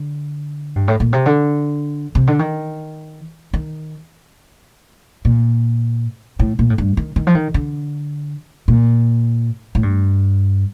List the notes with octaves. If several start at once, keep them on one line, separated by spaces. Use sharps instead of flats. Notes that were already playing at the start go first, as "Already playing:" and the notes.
Already playing: D3
G2
A2
A#2
C3
D3
C3
D3
D#3
D#3
A#2
A2
A#2
A2
G2
D#3
D#3
F3
D#3
D3
A#2
A2
G2